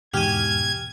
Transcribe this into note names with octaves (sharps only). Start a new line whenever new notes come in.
E2 G#2 B2 G4 G#5 F6 G#6